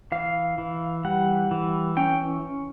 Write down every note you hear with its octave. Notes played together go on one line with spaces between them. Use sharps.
E3 F5
E3
G3 F#5
E3
C#4 G5